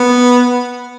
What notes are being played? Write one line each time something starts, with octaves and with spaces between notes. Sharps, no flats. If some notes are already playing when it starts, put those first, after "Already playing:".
Already playing: B3